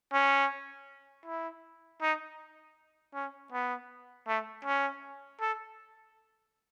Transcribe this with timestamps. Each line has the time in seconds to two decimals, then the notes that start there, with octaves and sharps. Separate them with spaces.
0.13 C#4
1.25 E4
2.02 D#4
3.14 C#4
3.52 B3
4.28 A3
4.65 C#4
5.41 A4